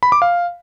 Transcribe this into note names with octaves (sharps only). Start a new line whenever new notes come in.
B5
D6
F5